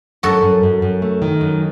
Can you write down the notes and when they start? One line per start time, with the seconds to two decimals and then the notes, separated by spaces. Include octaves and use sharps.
0.23 F#2 F#4 A4
0.42 F#2
0.63 F#2
0.82 F#2
1.02 A3
1.22 D#3
1.41 F#2